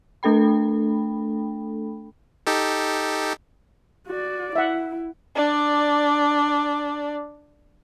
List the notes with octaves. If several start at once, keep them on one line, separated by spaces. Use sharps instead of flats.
A3 D4 A4 G5 B5
D#4 G4 A4
F#4 D5
E4 E5 F#5
D4 D5